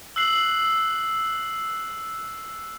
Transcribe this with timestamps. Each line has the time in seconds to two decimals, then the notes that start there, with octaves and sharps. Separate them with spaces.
0.16 E6 F#6 C7 F#7